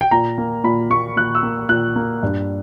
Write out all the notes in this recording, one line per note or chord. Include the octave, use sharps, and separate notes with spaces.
G5
A#2 A#5
A#3
A#2 B5
A#3 C#6
A#2 F#6
E6
A#3
A#2 F#6
A#3
G2